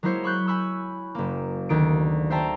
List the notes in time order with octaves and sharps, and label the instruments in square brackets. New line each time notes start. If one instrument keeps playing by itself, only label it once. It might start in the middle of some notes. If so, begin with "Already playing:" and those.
[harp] F#3 G#3 A#3 E4 C5 C#5
B5 C#6 F#6 G6
G#5 B5 C#6 E6
F#1 A#3
D2 D#3 D7
C5 E5 G5 A5 A#5